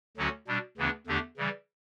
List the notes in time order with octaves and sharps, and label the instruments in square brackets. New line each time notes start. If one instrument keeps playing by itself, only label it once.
[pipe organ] D2 D3 F#3 C#4 F#4
B2 G3 D4
D2 C#3 E3 B3 D4
E2 D3 A3 D4 G4
C#3 E3 G3